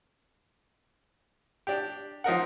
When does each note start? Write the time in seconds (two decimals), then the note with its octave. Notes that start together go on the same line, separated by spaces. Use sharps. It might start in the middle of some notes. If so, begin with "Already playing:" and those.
1.67 D4 G4
2.24 F3 D#4 A#4 F#5